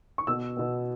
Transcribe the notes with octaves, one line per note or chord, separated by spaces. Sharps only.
C#6
B2 B3 E6
B2 B3